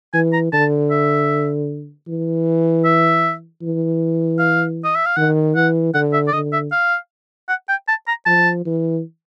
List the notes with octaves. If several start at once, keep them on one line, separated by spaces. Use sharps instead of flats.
E3 G#5
A#5
D3 A5
E5
E3
E5
E3
F5
D#5
E5
F5
D#3 F#5
E3 F#5
D3 F#5
E5
D5
D3 D#5
E5
F5
F#5
G5
A5
A#5
F3 A5
E3